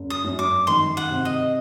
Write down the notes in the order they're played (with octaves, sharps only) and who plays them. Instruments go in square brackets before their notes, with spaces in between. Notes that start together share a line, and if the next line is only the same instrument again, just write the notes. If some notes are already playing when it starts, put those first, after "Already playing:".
Already playing: [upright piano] F#1
[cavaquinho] D#6
[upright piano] F#2
[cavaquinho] D6
[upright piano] D#3 [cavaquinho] C6
[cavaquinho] F#5
[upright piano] C3
[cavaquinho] D#5